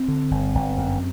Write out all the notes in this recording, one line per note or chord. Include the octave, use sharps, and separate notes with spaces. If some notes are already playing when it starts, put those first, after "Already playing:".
Already playing: C4
D3
G1
G1
F#2